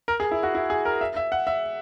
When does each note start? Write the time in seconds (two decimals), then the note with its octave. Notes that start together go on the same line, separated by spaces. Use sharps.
0.08 A#4
0.20 G#4
0.31 E4
0.43 F#4
0.55 E4
0.70 G#4
0.85 A#4
1.01 E5
1.16 E5
1.32 F#5
1.47 E5